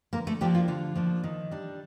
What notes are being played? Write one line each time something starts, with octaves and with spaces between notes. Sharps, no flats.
D3 A#3 A#4
A3 A4
F3 A#3 D4 G4
F4
D3 F4
F3 A#3 D4
D#3
G3 D4